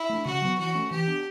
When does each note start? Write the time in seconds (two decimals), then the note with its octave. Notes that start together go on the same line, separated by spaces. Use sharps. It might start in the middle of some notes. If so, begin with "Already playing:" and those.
Already playing: E4
0.10 A3 D4
0.25 C#3 F#4
0.42 F#3 B3
0.58 E3 F#4
0.75 A3 C#4
0.91 E3 G4
1.07 B3 D4